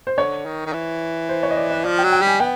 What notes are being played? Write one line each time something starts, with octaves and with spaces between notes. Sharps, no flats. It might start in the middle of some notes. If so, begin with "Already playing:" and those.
C5
D3 C#5
D#3
D#3
E3
C5
C#5
D#5
D5
D5
F3 D5
G5
F#3
G5
G3 G#5
B3 G5